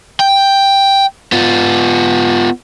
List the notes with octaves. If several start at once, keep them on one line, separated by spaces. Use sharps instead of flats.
G5
B3 F4